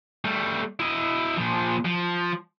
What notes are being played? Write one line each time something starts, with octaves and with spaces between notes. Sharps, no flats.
G3 A3
E4 D#5
A#2 F3
F3